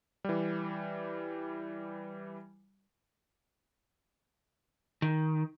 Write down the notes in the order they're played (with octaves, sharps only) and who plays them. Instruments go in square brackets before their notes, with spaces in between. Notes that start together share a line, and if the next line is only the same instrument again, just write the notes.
[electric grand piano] E3 G3
[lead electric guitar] D#3